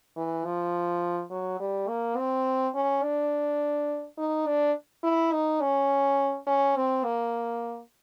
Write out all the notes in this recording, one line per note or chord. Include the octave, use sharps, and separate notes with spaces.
E3
F3
F#3
G3
A#3
C4
C#4
D4
D#4
D4
E4
D#4
C#4
C#4
C4
A#3